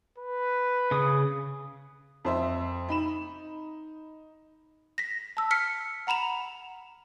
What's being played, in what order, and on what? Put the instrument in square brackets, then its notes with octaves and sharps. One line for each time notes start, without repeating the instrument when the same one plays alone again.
[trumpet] B4
[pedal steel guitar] C#3 D#6
[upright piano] F2 C5 E5
D#4 B5 E7
[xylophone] A#6 B6
A5 E6
F6 B6 C#7
F#5 A#5 B5 E7 F7